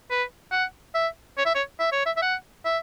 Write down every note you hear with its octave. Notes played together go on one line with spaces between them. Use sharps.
B4
F#5
E5
C#5
E5
C#5
E5
C#5
E5
E5
F#5
E5